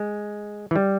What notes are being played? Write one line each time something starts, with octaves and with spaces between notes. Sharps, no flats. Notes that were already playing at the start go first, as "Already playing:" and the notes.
Already playing: G#3
E3
G3